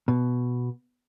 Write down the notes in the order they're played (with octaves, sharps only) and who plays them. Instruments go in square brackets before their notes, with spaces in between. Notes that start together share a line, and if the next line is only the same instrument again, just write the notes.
[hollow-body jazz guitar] B2